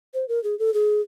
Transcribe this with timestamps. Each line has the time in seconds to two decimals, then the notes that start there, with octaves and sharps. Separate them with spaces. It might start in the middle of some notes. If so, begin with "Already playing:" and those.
0.14 C5
0.28 A#4
0.44 G#4
0.59 A4
0.74 G#4